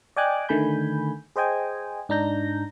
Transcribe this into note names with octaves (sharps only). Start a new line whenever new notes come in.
D5 D#5 G5 G#5 D6 F#6
D3 D#3 A3 G#5 B5 G6
G#4 C5 D#5 G5 G#5
G#2 D4 D#4 A#5 G6 A#6